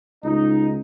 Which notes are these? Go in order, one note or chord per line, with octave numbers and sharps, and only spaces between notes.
C#2 D#4